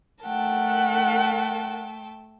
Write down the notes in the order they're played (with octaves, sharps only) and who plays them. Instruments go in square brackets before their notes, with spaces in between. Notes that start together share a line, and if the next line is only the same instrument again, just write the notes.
[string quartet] A3 G5 A5 [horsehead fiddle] A#4 F#5